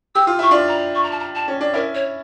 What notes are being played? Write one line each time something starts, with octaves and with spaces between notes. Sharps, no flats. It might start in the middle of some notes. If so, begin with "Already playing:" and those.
G4 E6
F4
E4 C#6
D4 F4
A#5
C#6
A#5
A5
A#5
A5
C#4
D4
C#4 E4 A#4
C#5